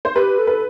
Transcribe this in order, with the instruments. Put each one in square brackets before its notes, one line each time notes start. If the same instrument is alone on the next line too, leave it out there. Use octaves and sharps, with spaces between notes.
[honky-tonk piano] C5
[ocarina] G4 [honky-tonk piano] B4
[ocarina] A4
[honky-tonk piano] B4